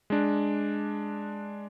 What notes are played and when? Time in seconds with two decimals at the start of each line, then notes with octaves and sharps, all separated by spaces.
0.10 G#3 D4